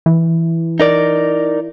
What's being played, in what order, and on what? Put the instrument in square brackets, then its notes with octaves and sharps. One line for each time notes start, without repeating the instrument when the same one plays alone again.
[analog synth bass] E3
[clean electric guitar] D#4 A#4 D5